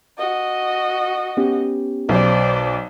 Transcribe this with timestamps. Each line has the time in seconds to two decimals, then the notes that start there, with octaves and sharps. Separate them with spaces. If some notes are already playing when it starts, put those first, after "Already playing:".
0.18 F#4 D#5
1.37 B3 C#4 G4
2.09 B1 C5 D5